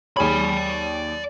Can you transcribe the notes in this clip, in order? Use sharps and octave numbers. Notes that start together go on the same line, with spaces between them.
D#2 G#4 C#5 D5 B5